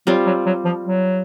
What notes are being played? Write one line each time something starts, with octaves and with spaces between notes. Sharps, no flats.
F#3 G3 C4 F4
F#3
F#3
F3
F#3